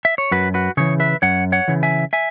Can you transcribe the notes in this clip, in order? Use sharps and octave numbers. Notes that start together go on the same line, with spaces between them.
E5
C#5
F#2 F#4 B4
F#4 B4
C#3 E3 G#4 C#5
B4 E5
F#2 C#5 F#5
C#5 F#5
C#3 E3
E5 G#5
E5 G#5